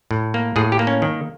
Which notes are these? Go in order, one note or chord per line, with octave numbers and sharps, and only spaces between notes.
A2
A#3
A2 G#4
G4
A#3
C#4
D#3